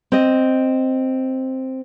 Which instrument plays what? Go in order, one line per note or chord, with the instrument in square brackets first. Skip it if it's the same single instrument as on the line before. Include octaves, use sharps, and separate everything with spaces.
[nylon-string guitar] C4 D#5